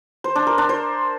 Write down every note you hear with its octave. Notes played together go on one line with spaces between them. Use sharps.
C5
D4
A#4
D4
C5